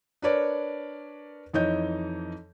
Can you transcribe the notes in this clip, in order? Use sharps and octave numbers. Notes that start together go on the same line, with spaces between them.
D4 A#4 B4 C#5 D5
F2 E3 D#4 C#5 D#5 G6